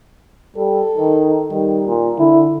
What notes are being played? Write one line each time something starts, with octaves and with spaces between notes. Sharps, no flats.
G3 A4
D#3
D#3 G3
A#2
D3 E4